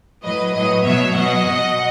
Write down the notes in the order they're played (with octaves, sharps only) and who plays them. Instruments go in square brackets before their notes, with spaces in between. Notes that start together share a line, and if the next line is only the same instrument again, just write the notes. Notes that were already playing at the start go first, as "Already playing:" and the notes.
[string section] A2 F#3 B4 D#5
A2 F#3 B4 D#5
B2 F#3 C#5 E5
B2 F#3 D#5 F#5
B2 F#3